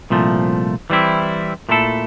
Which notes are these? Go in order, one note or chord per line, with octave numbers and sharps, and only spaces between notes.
C2 A#2 F3 A3
E3 G3 C4 E4
A#2 A3 E4 A4